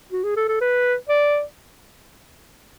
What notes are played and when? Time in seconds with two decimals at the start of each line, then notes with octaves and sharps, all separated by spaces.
0.12 F#4
0.24 G#4
0.36 A4
0.48 A4
0.61 B4
1.09 D5